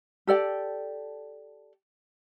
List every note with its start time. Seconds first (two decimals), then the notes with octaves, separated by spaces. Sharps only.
0.27 G4 A4 D5 G5